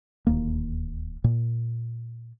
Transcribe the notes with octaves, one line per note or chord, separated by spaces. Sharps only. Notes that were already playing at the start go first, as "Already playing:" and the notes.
D1 D#2 A#3
A#2